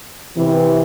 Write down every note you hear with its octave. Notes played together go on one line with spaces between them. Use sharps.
C3 E3